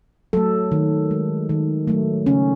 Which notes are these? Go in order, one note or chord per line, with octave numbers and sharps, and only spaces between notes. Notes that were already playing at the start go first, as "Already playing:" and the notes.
F#3 A3 A4
D#3
G#3
D#3
F#3 A3
C#3 C#4